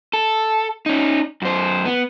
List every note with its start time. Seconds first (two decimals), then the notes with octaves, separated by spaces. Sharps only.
0.13 A4
0.86 C#4 D#4
1.42 F#2 C5
1.86 B3